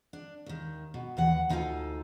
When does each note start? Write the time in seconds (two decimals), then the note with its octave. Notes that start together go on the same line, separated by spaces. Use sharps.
0.13 D4
0.46 D#2 D#3
0.94 B2
1.17 D#2 E3 F#5
1.49 D2 D#4 F4 A4 F5 G#5